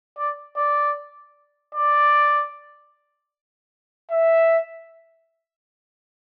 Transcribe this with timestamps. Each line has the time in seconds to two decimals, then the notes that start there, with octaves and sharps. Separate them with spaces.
0.18 D5
0.57 D5
1.75 D5
4.11 E5